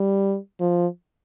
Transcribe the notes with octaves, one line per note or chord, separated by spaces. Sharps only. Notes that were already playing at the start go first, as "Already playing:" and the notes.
Already playing: G3
F3